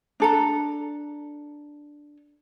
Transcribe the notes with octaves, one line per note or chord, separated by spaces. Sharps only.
D4 A4 A#5